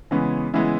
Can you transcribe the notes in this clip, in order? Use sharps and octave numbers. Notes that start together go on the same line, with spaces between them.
C#3 E3 G#3 B3
C#3 E3 G#3 B3 E4